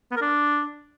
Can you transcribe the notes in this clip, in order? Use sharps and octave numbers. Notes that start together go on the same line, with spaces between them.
B3
A#4
D4